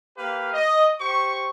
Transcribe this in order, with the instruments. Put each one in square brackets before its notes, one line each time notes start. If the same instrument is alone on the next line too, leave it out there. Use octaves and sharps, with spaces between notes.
[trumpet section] A#3 G4 B4 F5
D#5
G4 C5 C#6